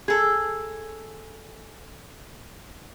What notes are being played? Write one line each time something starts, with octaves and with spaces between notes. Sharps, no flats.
G#4 A4